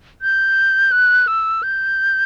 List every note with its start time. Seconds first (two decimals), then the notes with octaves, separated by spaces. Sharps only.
0.22 G6
0.92 F#6
1.27 E6
1.63 G6